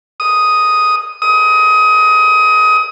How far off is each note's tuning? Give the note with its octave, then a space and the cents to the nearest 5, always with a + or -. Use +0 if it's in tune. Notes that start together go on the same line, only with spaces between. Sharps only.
D#6 +5
D#6 +25